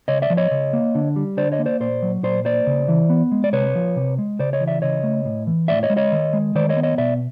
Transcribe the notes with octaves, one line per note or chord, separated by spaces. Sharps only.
C#3 C#5 D#5
D5 E5
F3
C#5 D#5
C#3
A#3
D3
G3
D3 C5 D5
C#5 D#5
A#3
C5 D5
A#2 C5 D5
F#3
A#2 C5 D5
A#3 C5 D5
C#3
E3
B3
G#3
D5
C3 B4 C#5
F3
C3
G#3
C#3 C5 D5
C#5 D#5
E3
D5 E5
C#3 C#5 D#5
A3
A2
E3
A2 D5 E5
C#5 D#5
G#3
C#5 D#5
D#3
G#3
D#3 C5 D5
C#5 D#5
B3
C#5 D#5
B2 D5 E5